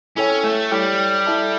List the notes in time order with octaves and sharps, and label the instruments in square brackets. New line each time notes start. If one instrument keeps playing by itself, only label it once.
[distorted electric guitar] C#4 [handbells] E4 A4 C#5 G5
[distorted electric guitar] A3
[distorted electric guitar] G3 [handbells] E4 A4 C#5 G5
[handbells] E4 A4 E5 A5